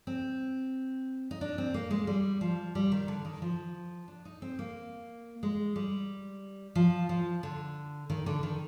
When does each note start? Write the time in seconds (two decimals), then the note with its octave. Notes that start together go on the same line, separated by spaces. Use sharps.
0.07 C4
1.31 D#4
1.41 D4
1.58 C4
1.74 A#3
1.91 G#3
2.07 G3
2.41 F3
2.75 G3
2.92 D#3
3.08 D3
3.25 D#3
3.42 F3
4.08 D4
4.25 D#4
4.42 C4
4.59 A#3
5.43 G#3
5.76 G3
6.75 F3
7.09 F3
7.43 D3
8.10 D#3
8.26 D3
8.43 D#3